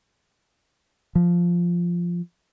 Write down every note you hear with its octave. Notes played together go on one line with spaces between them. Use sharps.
F3